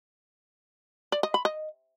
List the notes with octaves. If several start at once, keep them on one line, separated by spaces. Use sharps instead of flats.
D5
D#5
B5
D#5